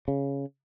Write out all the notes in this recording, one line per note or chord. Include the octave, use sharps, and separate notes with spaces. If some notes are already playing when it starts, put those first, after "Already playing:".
C#3